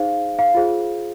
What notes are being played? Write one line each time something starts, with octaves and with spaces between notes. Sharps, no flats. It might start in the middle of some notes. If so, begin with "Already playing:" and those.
Already playing: D#4 G#4 C5 F5
F5
F4 G#4 C5